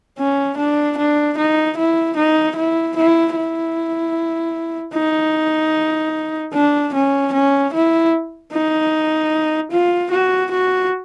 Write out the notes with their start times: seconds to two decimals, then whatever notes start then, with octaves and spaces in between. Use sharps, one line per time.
0.18 C#4
0.57 D4
0.98 D4
1.38 D#4
1.77 E4
2.16 D#4
2.56 E4
2.97 E4
3.36 E4
4.94 D#4
6.53 D4
6.94 C#4
7.33 C#4
7.73 E4
8.53 D#4
9.72 F4
10.11 F#4
10.51 F#4